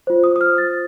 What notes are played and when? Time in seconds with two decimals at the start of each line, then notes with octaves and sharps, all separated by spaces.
0.07 F4 C5
0.24 D#6
0.36 D#6
0.41 F6
0.58 A6